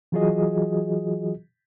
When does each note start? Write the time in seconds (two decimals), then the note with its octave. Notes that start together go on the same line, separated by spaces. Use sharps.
0.12 E3 F#3 F4 F#4 G#4 D#5